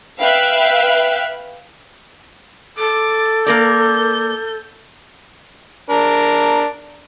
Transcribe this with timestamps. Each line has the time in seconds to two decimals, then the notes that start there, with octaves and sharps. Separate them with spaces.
0.20 B4 E5 F5 G5 F#6
2.78 A4 D6
3.46 A#3 A#4 D5 G6
5.90 D4 A#4